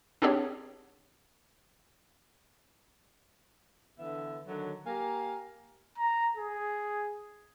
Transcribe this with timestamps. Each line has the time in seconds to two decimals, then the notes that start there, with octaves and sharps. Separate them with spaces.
0.22 B3 C4 D4 G4 G#4 C#5
3.99 D3 E3 B3 E5
4.47 D3 D#3 F#3
4.86 A#3 G4 F5 G#5 A#5
5.98 A#5
6.37 G#4